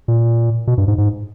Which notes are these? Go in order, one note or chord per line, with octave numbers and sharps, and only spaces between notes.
A#2
B2
G2
G#2
G#2